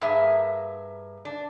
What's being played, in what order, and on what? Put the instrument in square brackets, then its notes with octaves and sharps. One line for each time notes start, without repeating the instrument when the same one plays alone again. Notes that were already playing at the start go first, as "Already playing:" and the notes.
[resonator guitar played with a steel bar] G2 A#3 G#4 E5
D4